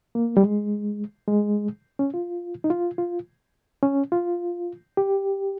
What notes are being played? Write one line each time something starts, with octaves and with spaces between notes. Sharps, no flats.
A#3
G3
G#3
G#3
C#4
F4
D#4
F4
F4
C#4
F4
G4